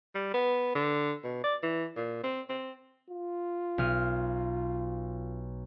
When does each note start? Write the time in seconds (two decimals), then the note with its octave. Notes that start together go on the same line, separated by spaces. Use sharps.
0.15 G3
0.34 B3
0.75 D3
1.24 B2
1.44 D5
1.63 E3
1.96 A#2
2.23 C4
2.49 C4
3.10 F4
3.78 B1 F6 D#7